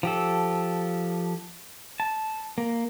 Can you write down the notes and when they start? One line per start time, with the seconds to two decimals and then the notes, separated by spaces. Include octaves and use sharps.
0.03 F3 G4 A4
2.00 A5
2.58 A#3